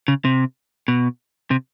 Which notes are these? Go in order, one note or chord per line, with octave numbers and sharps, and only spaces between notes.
C#3
C3
B2
C3